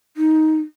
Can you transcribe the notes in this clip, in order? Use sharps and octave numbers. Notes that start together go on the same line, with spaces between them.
D#4